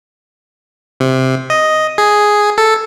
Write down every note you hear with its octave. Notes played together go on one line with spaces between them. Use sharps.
C3
D#5
G#4
A4